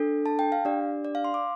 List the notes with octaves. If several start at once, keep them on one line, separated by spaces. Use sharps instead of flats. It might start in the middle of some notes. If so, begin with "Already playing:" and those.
Already playing: D4 A4
A5
G5
F5
D4 G4 D5
D5
F5
C6
D6